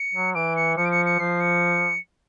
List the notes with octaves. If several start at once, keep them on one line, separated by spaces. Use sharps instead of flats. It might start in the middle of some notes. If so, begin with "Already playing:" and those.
Already playing: C#7
F#3
E3 D7
C#7
F3 C#7
D7
C#7
C#7
F3 C7
C#7